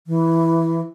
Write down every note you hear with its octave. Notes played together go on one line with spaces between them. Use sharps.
E3